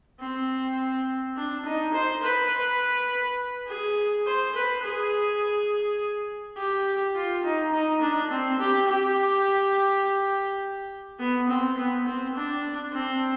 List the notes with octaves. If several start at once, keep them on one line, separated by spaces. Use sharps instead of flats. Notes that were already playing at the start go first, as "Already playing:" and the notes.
C4
D4
D#4
C5
B4
G#4
C5
B4
G#4
G4
F4
D#4
D#4
D4
C4
G4
G4
B3
C4
B3
C4
D4
C4